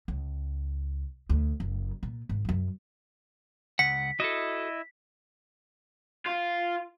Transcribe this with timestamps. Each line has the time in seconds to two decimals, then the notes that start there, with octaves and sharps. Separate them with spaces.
0.08 C#2
1.29 D2
1.60 F#1
2.03 A#2
2.29 G#1
2.45 F#2 F#3
3.79 C#2 F#5 B6
4.20 E4 F#4 A4 D#5
6.26 F4